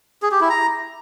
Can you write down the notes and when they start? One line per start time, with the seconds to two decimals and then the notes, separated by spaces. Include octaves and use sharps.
0.23 G#4
0.32 G4
0.41 E4
0.50 A#5